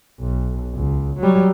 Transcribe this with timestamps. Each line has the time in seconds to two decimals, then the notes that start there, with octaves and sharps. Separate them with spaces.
0.20 B1
0.75 C#2
1.19 F#3 G3